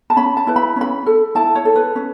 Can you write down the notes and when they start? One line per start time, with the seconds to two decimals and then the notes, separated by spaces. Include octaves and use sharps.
0.10 A5
0.16 C#4 B5
0.37 A5
0.47 E4 B4
0.56 B5
0.76 C#4 B5
1.06 A4
1.35 E4 A5
1.55 C#5
1.65 A4
1.76 B4
1.96 C#4